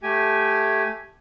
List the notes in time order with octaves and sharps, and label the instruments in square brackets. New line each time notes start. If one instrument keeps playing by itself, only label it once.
[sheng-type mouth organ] A3 G4 G#5